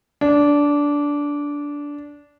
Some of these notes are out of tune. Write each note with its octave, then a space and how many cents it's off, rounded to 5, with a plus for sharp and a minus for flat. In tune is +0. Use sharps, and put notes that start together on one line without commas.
D4 -15